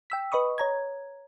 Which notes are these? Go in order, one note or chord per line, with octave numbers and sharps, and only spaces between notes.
G5 E6 B6
B4 D#5 B5 C#6 D#6
C#5 A#5 G#6